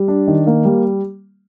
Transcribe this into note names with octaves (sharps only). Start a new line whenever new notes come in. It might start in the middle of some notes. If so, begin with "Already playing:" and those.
Already playing: G3
D4
D#3
A#3
G3